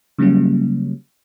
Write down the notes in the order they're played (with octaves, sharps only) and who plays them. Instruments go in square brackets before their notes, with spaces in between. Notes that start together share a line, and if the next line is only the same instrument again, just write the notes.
[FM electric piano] C#3 F#3 G3 A#3 C#4